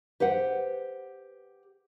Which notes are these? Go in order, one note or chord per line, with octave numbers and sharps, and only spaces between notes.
G4 B4 C5 F#5